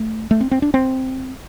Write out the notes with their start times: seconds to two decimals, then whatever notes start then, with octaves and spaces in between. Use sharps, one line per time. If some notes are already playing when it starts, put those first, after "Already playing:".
Already playing: A3
0.31 A3
0.41 C4
0.51 C4
0.62 D4
0.74 C4